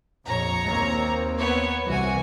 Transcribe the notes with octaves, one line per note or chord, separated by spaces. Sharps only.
A#1 F2 C#5 A#5
D#2 A#3 C4
B3 C#5
C2 C3 E3 F#4 G#5